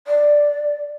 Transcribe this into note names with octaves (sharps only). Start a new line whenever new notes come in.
D5